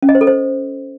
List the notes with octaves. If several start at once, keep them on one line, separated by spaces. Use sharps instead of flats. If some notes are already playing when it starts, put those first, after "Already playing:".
C#4
D#5
C5
A4
C5